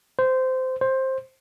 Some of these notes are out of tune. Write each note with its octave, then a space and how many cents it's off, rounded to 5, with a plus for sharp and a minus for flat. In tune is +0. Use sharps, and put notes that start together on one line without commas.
C5 -15
C5 +15